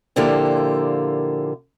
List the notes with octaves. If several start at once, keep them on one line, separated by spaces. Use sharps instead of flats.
A#2 D3 F3 A#3 E4 G4